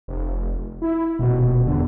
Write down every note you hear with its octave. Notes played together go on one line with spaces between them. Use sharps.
F1
E4
D#1 B2
E2 D3